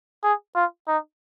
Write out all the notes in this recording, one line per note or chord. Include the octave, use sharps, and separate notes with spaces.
G#4
F4
D#4